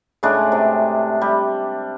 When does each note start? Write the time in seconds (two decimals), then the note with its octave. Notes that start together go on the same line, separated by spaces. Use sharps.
0.23 A2 C#3 G#3 D4
0.52 C3
1.21 G3